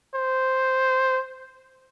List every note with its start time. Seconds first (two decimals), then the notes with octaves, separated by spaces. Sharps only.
0.15 C5